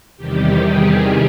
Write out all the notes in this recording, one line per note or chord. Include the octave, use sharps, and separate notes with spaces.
E2 C3 D#3 G3 G4
G#4